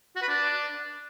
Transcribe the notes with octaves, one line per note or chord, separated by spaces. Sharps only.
F#4
B4
D4